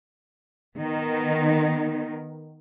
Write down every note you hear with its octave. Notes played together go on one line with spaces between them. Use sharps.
D#3 B3